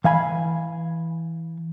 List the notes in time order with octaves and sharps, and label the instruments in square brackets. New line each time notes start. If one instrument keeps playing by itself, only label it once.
[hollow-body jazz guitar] E3 F5 G#5 B5